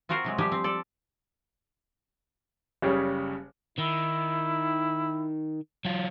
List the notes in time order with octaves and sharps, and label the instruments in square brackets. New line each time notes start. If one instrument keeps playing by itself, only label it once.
[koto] C4 F4 F#4 A#4 C5
C3 F#3 G#3
F3 G3 G4 B4 G#5
C4
A4 D5
[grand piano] F#1 C#3 G3 C#4 G4 G#4
[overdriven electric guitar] D#3 [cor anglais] E4
[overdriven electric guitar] F#3 F4